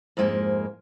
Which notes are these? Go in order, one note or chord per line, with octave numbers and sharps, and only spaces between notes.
F2 G#2 G#3 A#3